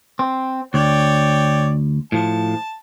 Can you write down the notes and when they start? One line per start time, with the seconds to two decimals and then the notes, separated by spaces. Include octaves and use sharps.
0.19 C4
0.74 D2 C#5 D5 G5
2.12 A2 F3 A5